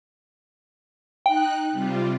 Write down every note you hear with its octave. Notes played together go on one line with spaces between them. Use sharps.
D#4 G5 F#6
C3 G3 F4